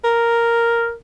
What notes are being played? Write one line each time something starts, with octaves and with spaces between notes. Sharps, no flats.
A#4